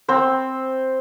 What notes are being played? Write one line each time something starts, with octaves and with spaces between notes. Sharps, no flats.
C4 C5